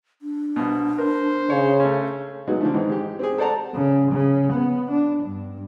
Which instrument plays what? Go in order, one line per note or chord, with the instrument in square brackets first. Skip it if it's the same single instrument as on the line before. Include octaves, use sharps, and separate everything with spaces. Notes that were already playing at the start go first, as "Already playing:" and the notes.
[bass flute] D4
[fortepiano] C2 B2
[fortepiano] A#4 [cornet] C5
[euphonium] C#3 [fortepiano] C#5
[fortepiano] A3 C#4
F#3 G#3 B3 D#4 F#4
D3 F3 A3
G#2 D#3 E3 C4 D#4
G#3 G4
C4 G4 G#4
A4 C5 D5 F#5 A5 A#5
[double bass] C#3
C#3
B3
D4
G2